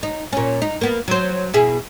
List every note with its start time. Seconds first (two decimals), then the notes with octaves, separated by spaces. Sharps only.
0.03 D#4
0.33 A#2 C#4
0.62 D#4
0.81 A#3 B3
1.08 F#3 C5
1.54 B2 E4 G#4